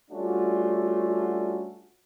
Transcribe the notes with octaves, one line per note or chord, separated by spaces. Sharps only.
G3 A3 C#4 D4 F4 F#4